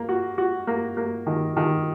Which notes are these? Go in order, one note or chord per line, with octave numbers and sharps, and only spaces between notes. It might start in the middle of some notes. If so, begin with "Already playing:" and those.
Already playing: A#3
F#4
F#4
A#3
A#3
D#3
D#3